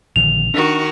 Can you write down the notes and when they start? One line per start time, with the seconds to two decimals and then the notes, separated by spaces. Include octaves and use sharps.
0.16 A#1 D3 D#3 F7
0.54 D#3 D4 F#4